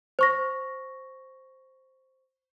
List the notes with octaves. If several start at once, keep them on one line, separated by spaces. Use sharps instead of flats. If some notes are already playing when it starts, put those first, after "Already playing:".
C5 C#6 A#6